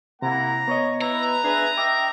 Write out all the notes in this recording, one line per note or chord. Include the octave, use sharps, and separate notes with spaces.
C3 A#3 E4 F#5 A#5
B3 C#5 D#5
E4 B4 A#5
D4 G#4 B4 E5
D#5 E5 G5 D6